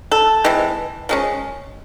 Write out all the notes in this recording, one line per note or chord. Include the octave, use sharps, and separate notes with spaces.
A4
E3 G#3 C4
F3 G#3 C#4